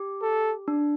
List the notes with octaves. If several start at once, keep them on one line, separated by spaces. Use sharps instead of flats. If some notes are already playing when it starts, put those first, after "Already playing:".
Already playing: G4
A4
D4